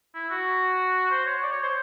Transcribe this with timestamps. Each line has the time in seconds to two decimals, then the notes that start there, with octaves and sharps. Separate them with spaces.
0.15 E4
0.30 F#4
1.11 C5
1.26 C#5
1.43 D5
1.52 C#5
1.63 C5